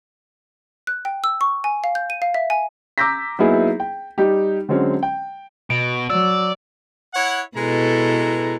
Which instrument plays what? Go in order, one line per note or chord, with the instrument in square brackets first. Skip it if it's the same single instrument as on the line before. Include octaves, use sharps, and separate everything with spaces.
[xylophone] F#6
G5
E6
C#6
G#5
F5
G6
D#7
F5
E5
G#5
[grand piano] A#5 D6 E6 G6 A#6 B6
F#3 A#3 B3 D#4 E4 G#4
G5
G3 D#4 G4
D3 F#3 G#3 C4 C#4
G5
[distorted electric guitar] B2 [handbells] D7
[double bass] F#3 [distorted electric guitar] D5 [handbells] E6
[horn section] E4 C#5 F#5
[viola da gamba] B2 E4 A4 [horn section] G#3 B4 A#5